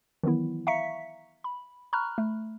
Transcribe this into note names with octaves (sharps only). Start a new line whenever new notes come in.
D#3 E3 F#3 B3 E4
E5 F5 A#5 C#6 B6 C#7
B5
A#5 B5 C#6 F6 F#6
A3